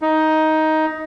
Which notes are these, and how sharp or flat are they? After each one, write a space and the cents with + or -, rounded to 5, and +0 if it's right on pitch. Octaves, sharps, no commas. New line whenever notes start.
D#4 +10